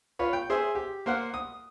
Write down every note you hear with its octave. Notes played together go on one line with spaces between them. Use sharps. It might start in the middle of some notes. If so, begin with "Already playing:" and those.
F4 B4 C#5
G5
G#4 C5 E5
G4
A#3 C5 F5 F#5
D#6